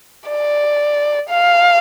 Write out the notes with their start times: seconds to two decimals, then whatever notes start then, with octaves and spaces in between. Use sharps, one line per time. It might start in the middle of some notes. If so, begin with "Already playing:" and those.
0.29 D5
1.30 F5